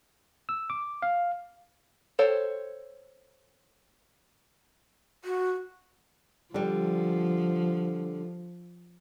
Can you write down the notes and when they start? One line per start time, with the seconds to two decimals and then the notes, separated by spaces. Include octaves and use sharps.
0.49 E6
0.70 D6
1.02 F5
2.19 A4 C5 C#5 G5
5.24 F#4
6.54 D3 F3 G3